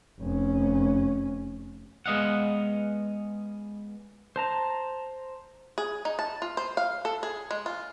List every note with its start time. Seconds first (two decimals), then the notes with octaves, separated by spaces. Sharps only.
0.20 F1 C#4
2.06 G#3 B3 D#5 F5 F#5
4.36 C5 A5 A#5
5.78 G#4
6.05 D#4
6.19 A5
6.42 F4
6.57 C5
6.77 F5
7.05 A4
7.23 G#4
7.51 G#3
7.66 F4